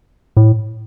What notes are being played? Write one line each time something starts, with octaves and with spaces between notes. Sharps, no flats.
A2